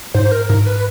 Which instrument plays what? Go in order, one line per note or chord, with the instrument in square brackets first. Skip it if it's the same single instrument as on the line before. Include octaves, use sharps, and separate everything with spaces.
[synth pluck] G#2 [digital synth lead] C5
[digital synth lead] A#4
[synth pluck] G#2 [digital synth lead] A#4
[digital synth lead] B4